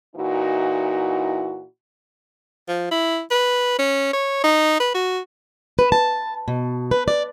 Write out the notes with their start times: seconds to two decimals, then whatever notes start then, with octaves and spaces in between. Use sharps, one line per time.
0.16 A#2 E3 D#4 E4 F#4
2.68 F3
2.91 E4
3.31 B4
3.79 C#4
4.13 C#5
4.44 D#4
4.80 B4
4.94 F#4
5.79 B4
5.92 A5
6.48 B2
6.91 B4
7.08 D5